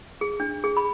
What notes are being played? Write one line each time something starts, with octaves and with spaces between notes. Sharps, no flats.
G#4
D4
G#4
B5